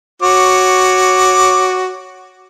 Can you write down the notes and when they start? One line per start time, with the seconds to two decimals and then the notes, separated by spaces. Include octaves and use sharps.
0.22 F#4 C#5 D6